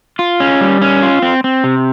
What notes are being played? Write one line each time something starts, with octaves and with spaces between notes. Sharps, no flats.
F4
C#4
G3
C#4
F4
C4
C4
C3